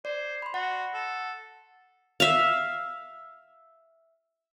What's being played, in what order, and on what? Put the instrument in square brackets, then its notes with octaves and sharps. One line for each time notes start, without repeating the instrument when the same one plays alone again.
[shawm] C5 [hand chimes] D5
[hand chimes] B5 C6
[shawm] F#4 [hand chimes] F#5
[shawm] A4
[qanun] E5 F5